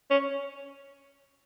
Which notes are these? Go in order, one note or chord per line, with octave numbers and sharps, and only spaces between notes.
C#4